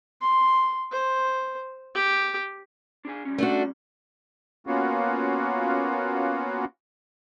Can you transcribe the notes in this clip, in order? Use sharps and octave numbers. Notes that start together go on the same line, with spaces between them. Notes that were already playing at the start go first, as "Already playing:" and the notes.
C6
C5
G4
D4 G#4 G#5
G3 C#4
A3 D4 F#4
A#3 B3 C#4 F4 F#4